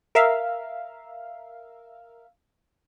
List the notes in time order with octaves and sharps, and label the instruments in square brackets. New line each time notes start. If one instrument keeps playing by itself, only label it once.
[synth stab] A#4 E5 F5